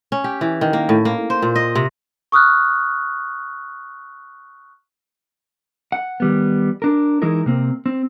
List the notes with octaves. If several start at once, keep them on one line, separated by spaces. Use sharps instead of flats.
C#4
G4
E3
D#3
A#3
A2
A#3
C5
A#2
D#5
C3
C#6 D#6 F6 F#6
F#5
D#3 G3 B3
D4 A#4
E3 G#3 D#4 E4 A#4
C3 A#3 C4
C4